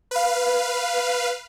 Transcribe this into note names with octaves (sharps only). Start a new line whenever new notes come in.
B4 F5